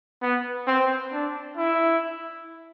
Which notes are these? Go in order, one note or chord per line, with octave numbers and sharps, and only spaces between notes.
B3
C4
D4
E4